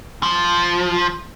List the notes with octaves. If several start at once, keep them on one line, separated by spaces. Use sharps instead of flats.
F3